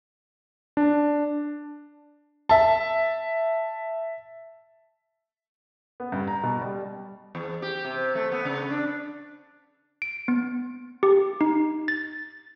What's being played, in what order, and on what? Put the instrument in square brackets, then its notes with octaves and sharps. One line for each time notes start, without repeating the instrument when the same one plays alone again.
[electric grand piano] D4
[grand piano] E5 A5
B3
G2
A#5
B2
G3
[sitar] E2
G4
C3
A3
B3
C#3
D4
[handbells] D7
B3
G4
D#4
A6